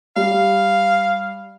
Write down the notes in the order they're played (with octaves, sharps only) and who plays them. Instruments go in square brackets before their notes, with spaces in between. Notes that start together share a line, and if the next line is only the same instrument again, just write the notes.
[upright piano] G3 [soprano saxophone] F5